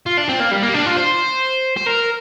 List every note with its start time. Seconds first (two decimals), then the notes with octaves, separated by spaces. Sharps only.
0.06 F4
0.18 D4
0.29 C4
0.40 A#3
0.51 G3
0.62 A#3
0.74 D4
0.86 F4
0.96 C5
1.77 C5
1.87 A#4